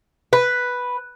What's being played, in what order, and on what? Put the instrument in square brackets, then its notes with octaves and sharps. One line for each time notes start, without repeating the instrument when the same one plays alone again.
[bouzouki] B4